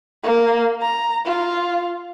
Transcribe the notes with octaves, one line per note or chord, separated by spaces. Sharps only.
A#3
A#5
F4